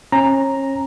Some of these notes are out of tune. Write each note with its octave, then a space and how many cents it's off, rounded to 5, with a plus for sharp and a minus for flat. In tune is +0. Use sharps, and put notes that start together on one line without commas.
C#4 -35 A#5 +0